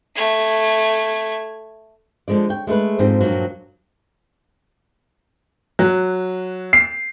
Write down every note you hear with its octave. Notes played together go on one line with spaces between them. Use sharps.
A3 G#6
D3 F3 G#3 D5
C#5 G5
G#3 A3 G#4 B4
F2 G#2 D3 C4 G4
G2 A#2 D#3 F3 F#3
F#3
C7